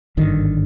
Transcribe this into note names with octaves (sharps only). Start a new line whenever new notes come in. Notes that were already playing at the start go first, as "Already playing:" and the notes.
G#1 G2 D3 D#3